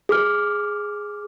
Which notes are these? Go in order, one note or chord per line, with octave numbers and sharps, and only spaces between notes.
G#4 D6 F6